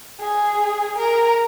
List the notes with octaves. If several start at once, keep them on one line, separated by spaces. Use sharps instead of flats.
G#4
A#4